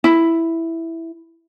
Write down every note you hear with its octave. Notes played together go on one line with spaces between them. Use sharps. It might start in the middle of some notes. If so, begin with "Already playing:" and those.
E4